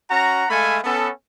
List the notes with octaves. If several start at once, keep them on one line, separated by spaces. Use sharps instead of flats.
C#4 F#4 F#5 A#5
G#3 A3 A4 F5 G#5 B5
B3 C#4 A4